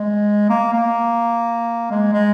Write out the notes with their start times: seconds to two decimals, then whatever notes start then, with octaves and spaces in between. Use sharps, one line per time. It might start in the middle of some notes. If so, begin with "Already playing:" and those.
Already playing: G#3
0.50 A#3
0.73 A#3
1.91 G#3
2.13 G#3